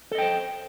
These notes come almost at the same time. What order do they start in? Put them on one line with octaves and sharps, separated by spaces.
A4 D#5 G5 C5